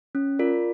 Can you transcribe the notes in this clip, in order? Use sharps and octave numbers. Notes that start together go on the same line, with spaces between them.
C#4
F4 A#4 D5